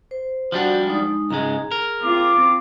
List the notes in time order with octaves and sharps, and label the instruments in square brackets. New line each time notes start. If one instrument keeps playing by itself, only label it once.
[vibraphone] C5
[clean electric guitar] F3 G3 D4 [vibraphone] F#4 F#5
[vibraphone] G#3 D#4
[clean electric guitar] C#2 G#2 G#3 [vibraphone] G#4 A#5
[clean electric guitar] A#4
[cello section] C4 F4 [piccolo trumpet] D6